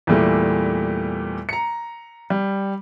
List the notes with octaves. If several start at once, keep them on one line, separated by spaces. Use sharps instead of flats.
E2 A#2 E3 G3 A3
A#5 C#7
G3